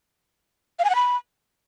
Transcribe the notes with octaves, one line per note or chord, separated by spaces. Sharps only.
F5
G#5
F#5
B5